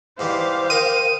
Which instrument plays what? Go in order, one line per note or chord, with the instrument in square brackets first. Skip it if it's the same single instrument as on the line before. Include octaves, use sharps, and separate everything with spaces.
[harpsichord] G#2 E3 G3 [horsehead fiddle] C5 F5 [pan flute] D6
[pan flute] A#4 [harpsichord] D#5 G5 D#6 [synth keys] D#7